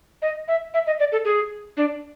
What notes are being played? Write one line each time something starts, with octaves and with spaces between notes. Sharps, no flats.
D#5
E5
E5
D#5
D5
A4
G#4
D4